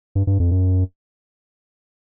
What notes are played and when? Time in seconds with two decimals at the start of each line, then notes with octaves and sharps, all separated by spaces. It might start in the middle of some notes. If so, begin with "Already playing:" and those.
0.15 G2
0.27 G2
0.40 F2
0.51 F#2